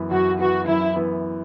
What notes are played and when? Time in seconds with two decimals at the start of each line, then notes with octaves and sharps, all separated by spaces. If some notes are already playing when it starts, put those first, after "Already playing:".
Already playing: F#2 E3 B3
0.11 F#2 F#4
0.39 E3 B3 F#4
0.67 F#2 E4
0.96 E3 B3